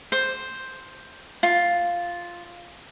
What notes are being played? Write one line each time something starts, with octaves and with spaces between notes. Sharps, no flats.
C5
F4